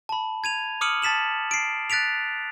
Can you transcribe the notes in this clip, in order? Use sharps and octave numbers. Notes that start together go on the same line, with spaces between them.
A5 B5
G#6 D#7 F7
D6 D#6 F6 C#7 D#7 F#7
A5 A6 B6 E7 F#7
C7 D7
F#6 A6 B6 D7 F7